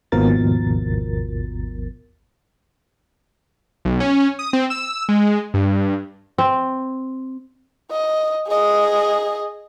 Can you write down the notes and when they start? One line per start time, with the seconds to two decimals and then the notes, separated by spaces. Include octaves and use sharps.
0.12 G#1 D#2 B2 F3 A#4 A6
3.85 B1
4.00 C#4
4.39 D#6
4.53 C4
4.70 E6
5.09 G#3
5.54 G2
6.38 C4
7.91 D#5
8.48 G#4 D#5